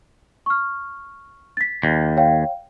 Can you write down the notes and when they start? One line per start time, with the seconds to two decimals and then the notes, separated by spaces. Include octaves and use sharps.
0.46 C#6 F6
1.57 A6 B6
1.83 D#2
2.17 C#5 F5 G5